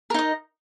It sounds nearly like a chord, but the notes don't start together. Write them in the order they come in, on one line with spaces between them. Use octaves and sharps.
A#4 D#4 D#5